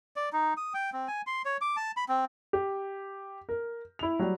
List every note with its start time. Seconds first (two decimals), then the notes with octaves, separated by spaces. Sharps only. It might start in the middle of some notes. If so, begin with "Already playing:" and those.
0.16 D5
0.33 D#4
0.57 D#6
0.74 G5
0.93 C4
1.08 G#5
1.27 C6
1.45 C#5
1.61 D6
1.76 A5
1.97 B5
2.09 C4
2.53 G4
3.49 A#4
3.99 E4 F7
4.19 F#3 G3